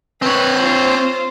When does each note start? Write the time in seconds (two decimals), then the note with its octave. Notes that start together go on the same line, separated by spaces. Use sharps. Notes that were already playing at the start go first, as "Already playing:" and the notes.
0.22 C4 B4 C#5 F#6
0.61 F4 C5